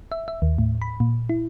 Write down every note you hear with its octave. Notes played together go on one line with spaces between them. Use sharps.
E5
E5
D#2
A2
B5
A#2
E4